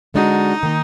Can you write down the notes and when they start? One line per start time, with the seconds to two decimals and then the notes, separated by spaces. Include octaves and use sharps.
0.14 D3 G#3 D4 D#4 F#4
0.63 D#3 A#3